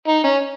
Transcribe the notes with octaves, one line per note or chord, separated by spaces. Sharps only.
D#4
C#4